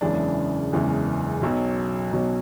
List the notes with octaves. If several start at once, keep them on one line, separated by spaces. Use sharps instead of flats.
F#1 E2 C#3 E3 G#3 D4
F#1 E2 C#3 E3 G#3
B1 B2 F#3
B1 B2 F#3